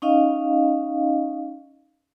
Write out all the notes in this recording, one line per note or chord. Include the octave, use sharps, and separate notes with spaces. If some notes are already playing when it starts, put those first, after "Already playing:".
C#4 D#4 D#5 F5